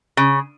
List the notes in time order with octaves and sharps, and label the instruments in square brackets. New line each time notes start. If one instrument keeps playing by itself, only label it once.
[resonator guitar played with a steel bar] C#3